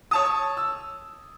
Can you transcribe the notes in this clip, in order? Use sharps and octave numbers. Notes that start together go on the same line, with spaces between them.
C#5 A5 D#6
E6